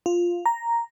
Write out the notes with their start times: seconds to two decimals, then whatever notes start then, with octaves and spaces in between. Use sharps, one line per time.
0.06 F4
0.46 A#5